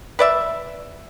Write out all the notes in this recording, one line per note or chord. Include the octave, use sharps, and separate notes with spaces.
B4 D5 E5